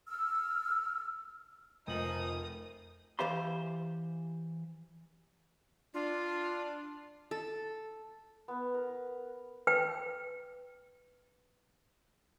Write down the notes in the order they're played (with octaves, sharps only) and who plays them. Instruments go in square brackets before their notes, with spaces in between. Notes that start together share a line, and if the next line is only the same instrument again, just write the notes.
[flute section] E6 F6
[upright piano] F1 F#7 [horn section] F3 D#4 [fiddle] A#4 D#6
[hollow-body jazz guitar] E3 G4 C5 F5 B5 C6
[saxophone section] D4 [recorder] F4
[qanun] A4
[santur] B3
A#4
[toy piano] B4 G5